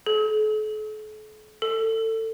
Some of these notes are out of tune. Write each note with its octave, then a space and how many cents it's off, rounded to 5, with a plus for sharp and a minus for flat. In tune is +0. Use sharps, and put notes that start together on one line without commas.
A4 -45
A4 +25